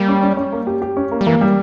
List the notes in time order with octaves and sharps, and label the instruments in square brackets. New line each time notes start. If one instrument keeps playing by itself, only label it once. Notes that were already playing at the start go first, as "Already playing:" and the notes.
Already playing: [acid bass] G3 [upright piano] A#3
[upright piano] C#4
C#4
C#4
A#3
G4
G4
C#4
A#3
[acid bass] G3
[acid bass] E3 [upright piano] A#3
[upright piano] G3